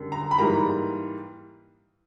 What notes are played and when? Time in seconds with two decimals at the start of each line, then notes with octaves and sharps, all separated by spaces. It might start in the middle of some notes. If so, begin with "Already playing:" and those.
Already playing: F#2 D3 G3
0.12 A#5
0.31 B5
0.38 G#2 E3 G3 A#3 A#5